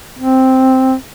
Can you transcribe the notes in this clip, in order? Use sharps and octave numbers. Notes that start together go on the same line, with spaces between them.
C4